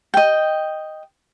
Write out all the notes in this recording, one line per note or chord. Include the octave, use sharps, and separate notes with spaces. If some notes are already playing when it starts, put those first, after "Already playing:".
D#5 G5